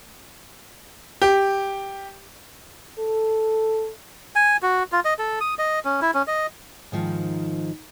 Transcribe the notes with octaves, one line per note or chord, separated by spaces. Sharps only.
G4
A4
G#5
F#4
F4
D#5
A4
D#6
D#5
C#4
E4
C#4
D#5
G#2 D#3 F3